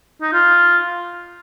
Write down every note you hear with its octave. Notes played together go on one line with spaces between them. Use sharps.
D#4
F4